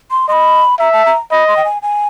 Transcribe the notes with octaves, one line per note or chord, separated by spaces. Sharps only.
C6
D#5 B5 C6
E5 A#5
A5
A#5
D#5 B5
C6
G5
G#5
G#5